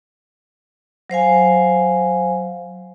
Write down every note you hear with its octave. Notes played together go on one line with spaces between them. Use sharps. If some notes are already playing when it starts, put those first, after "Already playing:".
F#3 C5 F5 G#5